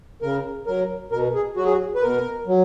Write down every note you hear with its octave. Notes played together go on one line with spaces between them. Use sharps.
C#3 A#4
F#3 A#4
B2 A#4
G#4
F#3 F#4
G#4
F#4
B4
B2 A#4
F#3